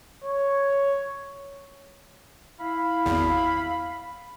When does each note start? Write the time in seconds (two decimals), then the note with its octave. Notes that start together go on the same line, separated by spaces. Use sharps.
0.24 C#5
2.60 E4 F5 B5
3.06 G#1 E2